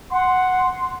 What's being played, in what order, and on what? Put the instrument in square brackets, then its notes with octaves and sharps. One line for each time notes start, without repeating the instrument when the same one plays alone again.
[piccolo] F#5 [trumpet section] C6